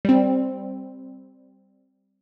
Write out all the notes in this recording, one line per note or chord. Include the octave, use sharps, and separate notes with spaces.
G3 C4